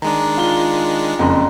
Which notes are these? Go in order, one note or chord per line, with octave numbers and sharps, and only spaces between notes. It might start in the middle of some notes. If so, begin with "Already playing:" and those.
D#3 G#3 D4 A#5
F4 G7
F#1 F2 A#5 C6